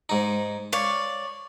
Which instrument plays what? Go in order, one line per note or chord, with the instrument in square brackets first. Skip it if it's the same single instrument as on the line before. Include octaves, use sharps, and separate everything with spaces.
[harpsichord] G#2 D#4
[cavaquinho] C#5 D5 [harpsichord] F5